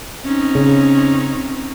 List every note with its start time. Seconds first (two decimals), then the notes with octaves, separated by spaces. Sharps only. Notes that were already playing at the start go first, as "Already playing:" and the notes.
0.24 C4 C#4 D#4
0.55 C#3